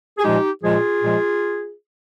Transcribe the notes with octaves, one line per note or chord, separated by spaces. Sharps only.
G#4
A#2 F3 G#3 D#4 G4
A#2 F3 G#3 F4 G#4
A#2 F3 G#3